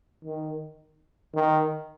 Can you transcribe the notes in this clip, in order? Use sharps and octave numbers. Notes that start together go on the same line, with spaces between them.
D#3
D#3